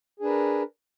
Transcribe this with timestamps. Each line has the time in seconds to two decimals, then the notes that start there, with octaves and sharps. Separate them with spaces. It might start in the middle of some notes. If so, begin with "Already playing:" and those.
0.20 G#4
0.22 D4
0.25 B4
0.27 A#4